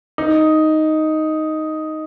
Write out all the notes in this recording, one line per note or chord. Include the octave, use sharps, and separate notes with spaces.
D#4